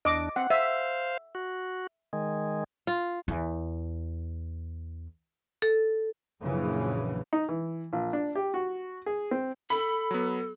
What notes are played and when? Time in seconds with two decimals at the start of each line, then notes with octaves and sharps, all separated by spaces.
0.05 E2 D4 D#5 D6
0.36 C4 F#5
0.50 C5 E5 F5
1.35 F#4
2.13 D#3 G#3
2.87 F4
3.28 E2 E4
5.62 A4
6.42 A#1 F#2 C#3 E3
7.33 D#4
7.49 E3
7.93 A#1
8.13 D4
8.35 G4
8.54 F#4
9.06 G#4
9.31 C4
9.70 A4 B5
10.11 F#3 B3